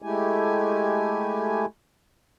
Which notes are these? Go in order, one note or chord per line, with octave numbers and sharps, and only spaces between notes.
G#3 A3 E4 G4 G#5